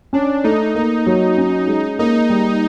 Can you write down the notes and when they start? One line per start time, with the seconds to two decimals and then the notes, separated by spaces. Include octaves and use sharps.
0.13 C#4 D4
0.44 A3 D#4
0.75 A#3 D#4
1.06 F#3
1.38 C#4
1.67 G#3
1.99 A#3 D#4
2.29 G3